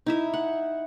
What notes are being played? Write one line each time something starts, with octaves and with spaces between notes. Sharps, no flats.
D#4 E4 E5
F#5